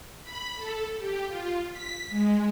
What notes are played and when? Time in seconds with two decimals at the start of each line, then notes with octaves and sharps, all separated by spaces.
0.23 B5
0.55 A4
0.97 G4
1.27 F4
1.71 B6
2.10 G#3